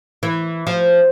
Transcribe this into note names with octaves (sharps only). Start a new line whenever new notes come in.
E3
F3